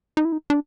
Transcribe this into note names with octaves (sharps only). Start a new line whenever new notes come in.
D#4
E4
D#4
D4